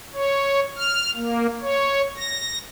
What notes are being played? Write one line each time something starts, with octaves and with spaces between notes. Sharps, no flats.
C#5
F6
A#3
C#5
A#6